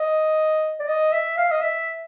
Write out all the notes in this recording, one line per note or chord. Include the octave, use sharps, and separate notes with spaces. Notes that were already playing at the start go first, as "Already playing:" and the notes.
Already playing: D#5
D5
D#5
E5
F5
D#5
E5